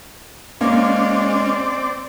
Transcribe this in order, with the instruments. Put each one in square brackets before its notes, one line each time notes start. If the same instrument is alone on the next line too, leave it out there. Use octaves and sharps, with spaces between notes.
[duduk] G#3 [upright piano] A#3 [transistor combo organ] C4 D5 [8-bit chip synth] C#4